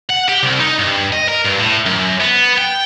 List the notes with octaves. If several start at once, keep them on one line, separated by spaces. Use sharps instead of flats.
F#5
G4
C2
D#4
G2
D#5
A#4
G2
A2
F#2
B3
G5